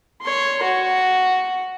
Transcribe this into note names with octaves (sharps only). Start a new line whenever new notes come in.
C#5 C6
F#4